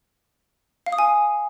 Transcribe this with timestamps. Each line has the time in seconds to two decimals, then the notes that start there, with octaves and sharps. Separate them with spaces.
0.86 F5
0.92 D#6
0.99 G#5